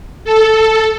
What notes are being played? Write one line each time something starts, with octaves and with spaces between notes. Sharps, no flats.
A4